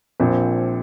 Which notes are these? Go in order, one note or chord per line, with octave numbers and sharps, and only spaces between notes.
A#1 A#2 F3 C4